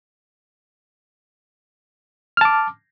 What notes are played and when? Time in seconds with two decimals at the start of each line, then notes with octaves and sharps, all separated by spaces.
2.37 F6
2.41 A5
2.45 D6